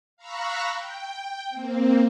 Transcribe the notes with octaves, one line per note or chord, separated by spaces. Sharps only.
F5 A#5 B5 C#6 E6 F#6
G5
A#3 C4